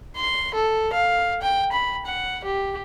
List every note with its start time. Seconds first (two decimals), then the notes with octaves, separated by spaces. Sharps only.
0.16 C6
0.54 A4
0.93 F5
1.42 G5
1.72 B5
2.06 F#5
2.45 G4